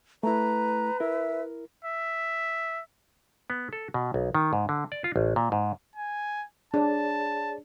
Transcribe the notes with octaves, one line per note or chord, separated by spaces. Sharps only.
A3 E4 B4 A#5
E4 A#4 E5
E5
B3
A4
B2
B1
D#3
G#2
D3
D5
F4
A1
A#2
G#2
G#5
D4 G#4 C#5 D5 A5